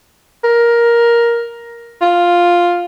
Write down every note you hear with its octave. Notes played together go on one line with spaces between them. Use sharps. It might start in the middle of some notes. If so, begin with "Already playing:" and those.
A#4
F4